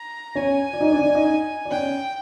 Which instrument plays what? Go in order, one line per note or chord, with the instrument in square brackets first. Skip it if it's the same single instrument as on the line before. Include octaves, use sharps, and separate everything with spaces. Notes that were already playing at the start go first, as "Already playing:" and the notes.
Already playing: [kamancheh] A#5
[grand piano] C#4 C#5 [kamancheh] G#5
[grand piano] D5
D#4 D#5
D4 D5
D4 D5
D#4 D#5
D5
[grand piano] C#4 C#5 [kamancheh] G5